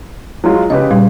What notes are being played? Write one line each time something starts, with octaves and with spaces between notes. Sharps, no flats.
F#3 G#3 F4
C#3 G4 B4 D#5
A#2 G3